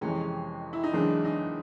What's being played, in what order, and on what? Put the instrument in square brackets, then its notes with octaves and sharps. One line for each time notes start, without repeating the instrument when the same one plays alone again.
[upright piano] F2 C3 E3 G#3 [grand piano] C#4
[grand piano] E4
D#4
[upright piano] F#2 C#3 E3 G#3 [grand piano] D4
[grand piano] D#4